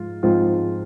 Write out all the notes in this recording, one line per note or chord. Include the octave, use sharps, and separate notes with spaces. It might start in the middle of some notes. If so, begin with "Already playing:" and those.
Already playing: G#2 F3 F4
G#2 F3 C4 F4